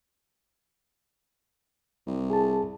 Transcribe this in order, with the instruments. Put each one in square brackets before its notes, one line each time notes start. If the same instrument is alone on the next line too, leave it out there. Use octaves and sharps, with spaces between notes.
[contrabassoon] C2
[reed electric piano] G#4 A5